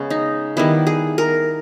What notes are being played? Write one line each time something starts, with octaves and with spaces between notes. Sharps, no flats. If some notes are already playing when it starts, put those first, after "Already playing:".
Already playing: C#3 G#3 B3 C#4
D#4
D#3 G3 B3 E4
G#4
A#4